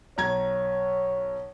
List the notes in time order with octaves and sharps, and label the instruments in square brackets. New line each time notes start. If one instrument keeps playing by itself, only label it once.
[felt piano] B1 A#5 G#6 [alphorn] C#5